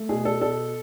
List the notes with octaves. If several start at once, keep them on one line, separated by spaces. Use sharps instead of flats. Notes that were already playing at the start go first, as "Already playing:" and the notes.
Already playing: A3
B2 G#4
A4
B2 A4